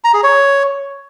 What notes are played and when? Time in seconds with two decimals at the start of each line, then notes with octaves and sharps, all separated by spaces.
0.04 A#5
0.14 G#4
0.23 C#5